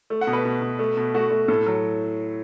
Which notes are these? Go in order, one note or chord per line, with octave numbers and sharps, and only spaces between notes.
A3
F#5
B2
B4
B2
B2
A3
B2
A3 F#4
A3
A2 A4
F#3